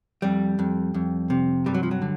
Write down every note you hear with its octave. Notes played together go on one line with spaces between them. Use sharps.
F2 G3
F2
F2
C3
G2 G3
F#3
F3
F#3
D3